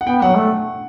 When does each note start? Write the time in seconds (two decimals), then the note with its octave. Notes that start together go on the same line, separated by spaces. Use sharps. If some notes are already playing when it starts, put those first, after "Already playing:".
0.01 F#5
0.07 B3 G5
0.22 F#3 F#5
0.37 A3